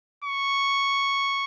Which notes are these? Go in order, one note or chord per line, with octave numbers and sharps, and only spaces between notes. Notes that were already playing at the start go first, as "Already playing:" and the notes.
C#6